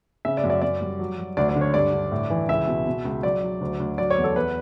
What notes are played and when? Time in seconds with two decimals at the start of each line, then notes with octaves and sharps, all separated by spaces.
0.25 C#3 E5
0.37 D5
0.44 F#2
0.50 D5
0.62 F#2 D5
0.81 G3
0.99 F#3
1.18 F#3
1.37 D2 D5
1.49 D5
1.55 D3
1.61 C#5
1.74 G2 D5
1.93 D3
2.12 A2
2.30 E3
2.49 C#2 E5
2.67 B2
2.86 B2
3.05 C#2
3.23 F#3 D5
3.43 F#3
3.61 D2
3.80 D2
3.98 F#3 D5
4.11 C#5
4.17 E2
4.24 A4
4.36 E2 B4